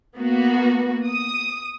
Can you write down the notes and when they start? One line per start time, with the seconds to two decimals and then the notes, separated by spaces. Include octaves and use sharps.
0.17 A#3 B3 F#4
1.07 D#6